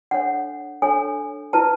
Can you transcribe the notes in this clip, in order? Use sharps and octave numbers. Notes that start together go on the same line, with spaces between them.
D4 A4 C#5 F#5
D4 A4 C#5 G#5
E4 B4 A5